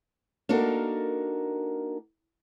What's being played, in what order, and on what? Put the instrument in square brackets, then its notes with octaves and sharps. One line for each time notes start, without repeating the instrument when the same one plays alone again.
[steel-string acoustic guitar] A#3 D4 D#4 F#4 A4 A#4